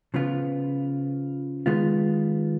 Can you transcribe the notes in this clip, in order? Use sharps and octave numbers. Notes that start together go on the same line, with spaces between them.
C#3 F3 B3 F4
D#3 G#3 B3 F4